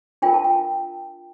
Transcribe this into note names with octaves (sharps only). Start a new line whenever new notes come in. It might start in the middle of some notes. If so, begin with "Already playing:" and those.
D4 F4 A#4 G5
A5
G5